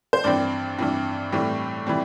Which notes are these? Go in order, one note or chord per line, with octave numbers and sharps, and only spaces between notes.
C5
G2 E3 C4 D5
G2 E3 C4
A2 E3 G3 C4
E3 G3 C4